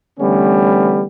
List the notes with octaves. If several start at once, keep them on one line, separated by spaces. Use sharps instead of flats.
D3 E3 G3 A3 B3 C#4